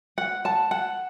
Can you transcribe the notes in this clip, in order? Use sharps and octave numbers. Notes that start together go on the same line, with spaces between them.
F#5
A5
F#5